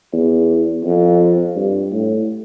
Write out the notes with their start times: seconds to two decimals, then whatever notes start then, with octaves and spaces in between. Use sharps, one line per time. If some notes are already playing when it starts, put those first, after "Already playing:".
0.13 E2
0.84 F2
1.56 G2
1.93 A2